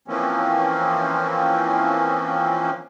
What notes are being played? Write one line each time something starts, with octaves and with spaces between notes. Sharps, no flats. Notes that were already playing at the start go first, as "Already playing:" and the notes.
E3 F3 A#3 C4 C#4